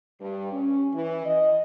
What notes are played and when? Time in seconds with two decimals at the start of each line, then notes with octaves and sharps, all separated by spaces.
0.21 G2
0.52 C#4
0.94 E3
1.25 D#5